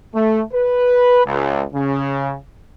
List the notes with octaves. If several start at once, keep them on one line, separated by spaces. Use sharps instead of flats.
A3
B4
C#2
C#3